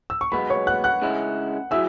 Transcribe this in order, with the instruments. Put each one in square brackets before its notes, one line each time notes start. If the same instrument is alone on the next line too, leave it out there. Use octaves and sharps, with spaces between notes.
[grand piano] E6
C#6
[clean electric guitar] B1 B2 G#3 B3 [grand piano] B4 B5
[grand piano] C#5 C#6
F#5 F#6
F#5 F#6
[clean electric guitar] C#3 G#3 C#4 E4
[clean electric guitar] F#3 E4 G#4 [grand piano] E5 E6